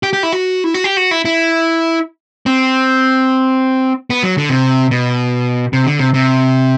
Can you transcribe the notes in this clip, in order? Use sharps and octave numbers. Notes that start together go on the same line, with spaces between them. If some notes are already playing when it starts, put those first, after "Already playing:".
G4
G4
E4
F#4
E4
F#4
G4
F#4
E4
E4
C4
B3
F#3
D3
C3
B2
C3
D3
C3
C3